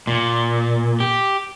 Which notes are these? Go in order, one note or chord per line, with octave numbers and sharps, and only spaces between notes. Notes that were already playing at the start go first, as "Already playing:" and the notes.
A#2
G4